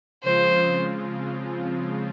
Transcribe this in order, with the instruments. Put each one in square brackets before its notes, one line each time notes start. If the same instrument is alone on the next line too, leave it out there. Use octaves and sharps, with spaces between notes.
[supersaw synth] C#3 F3 G#3 C4 F4 [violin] C5